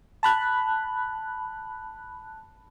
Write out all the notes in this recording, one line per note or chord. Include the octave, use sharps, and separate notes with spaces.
A5 B5 F#6